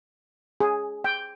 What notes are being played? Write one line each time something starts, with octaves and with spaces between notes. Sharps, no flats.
G#4
G5